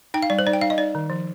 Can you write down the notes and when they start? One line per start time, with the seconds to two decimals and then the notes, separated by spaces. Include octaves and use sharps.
0.14 D#4 G5
0.22 F5
0.30 G3 D5
0.39 C5
0.47 D#4 D5
0.53 G5
0.61 D#4 F5
0.70 D#5
0.78 D#4 D5
0.95 D#3
1.10 F3